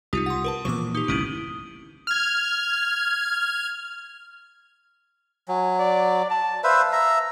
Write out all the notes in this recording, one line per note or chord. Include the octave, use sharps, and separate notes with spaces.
C2 D#4 F4 G4 D#6
F#5 C6
A#4 B4 A5
A#2 E3 F3 C#6 D6
D#4 G4 D#6 G7
G1 C2 A3 C#4 E4 D7 D#7 F#7
F6 G#6
F#3 G#5
D5
A5
B4 C5 E5 F5
E5 A#5